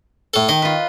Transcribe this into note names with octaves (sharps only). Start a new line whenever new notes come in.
A2 A4
D#3 D#5
F4 B4